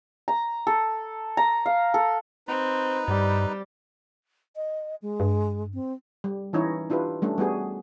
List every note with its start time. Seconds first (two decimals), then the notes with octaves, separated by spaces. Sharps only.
0.28 A#5
0.67 A4
1.37 A#5
1.66 F5
1.94 A4
2.48 C4 D#4 B4
3.08 G2 G3
4.56 D#5
5.02 G#3
5.20 G2
5.74 C4
6.24 G3
6.53 E3 C#4 D#4 E4 C#5
6.90 D4 E4 F4 G4 B4
7.22 G3 A3 C#4 D4
7.38 G3 B3 F#4 G#4